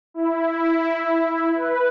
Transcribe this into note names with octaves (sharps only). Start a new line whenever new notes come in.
E4
B4